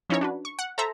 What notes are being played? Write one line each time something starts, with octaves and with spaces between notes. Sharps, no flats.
F3 C#4 D#4 E4 A#4 C#5
D4 F#4 B4
C#6
F#5
A4 C5 E5 A#5